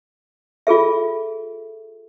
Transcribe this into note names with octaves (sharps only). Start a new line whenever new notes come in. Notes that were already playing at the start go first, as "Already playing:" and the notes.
F4 G#4 A4 E5